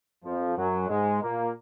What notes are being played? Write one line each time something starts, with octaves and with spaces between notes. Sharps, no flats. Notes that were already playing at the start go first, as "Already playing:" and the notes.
F2 F3
F#2 F#3
G#2 G#3
A#2 A#3